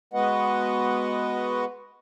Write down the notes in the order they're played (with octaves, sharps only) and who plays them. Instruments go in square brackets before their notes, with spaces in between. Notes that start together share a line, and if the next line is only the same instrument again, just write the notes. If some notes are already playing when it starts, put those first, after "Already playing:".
[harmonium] G#3 B3 F#4 B4 D#5 F#5